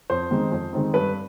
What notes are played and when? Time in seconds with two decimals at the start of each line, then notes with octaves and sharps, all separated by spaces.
0.10 F2 C5
0.31 D#3 G#3 C4 D#4
0.52 F2
0.73 D#3 G#3 C4 D#4
0.94 G2 B4